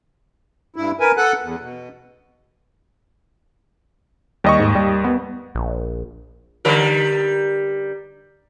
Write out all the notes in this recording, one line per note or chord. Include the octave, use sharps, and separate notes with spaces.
G2 E4
A#4 B4 G#5
A4 F#5 F#6
E2
B2
D#2 G3 D#5 C#6
G#2
G3
B3
A#1
D3 G3 A#4